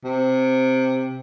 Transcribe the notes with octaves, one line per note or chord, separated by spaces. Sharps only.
C3